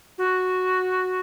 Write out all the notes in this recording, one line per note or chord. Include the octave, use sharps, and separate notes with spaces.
F#4